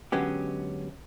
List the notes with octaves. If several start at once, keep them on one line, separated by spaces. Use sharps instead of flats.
D3 F#3 G#3 B3 C#4 G4